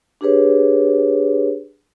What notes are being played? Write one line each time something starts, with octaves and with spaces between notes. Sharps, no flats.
D4 G4 G#4 B4 C#5